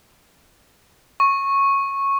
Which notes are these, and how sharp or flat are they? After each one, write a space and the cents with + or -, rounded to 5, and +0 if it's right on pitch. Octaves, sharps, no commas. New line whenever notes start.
C#6 -10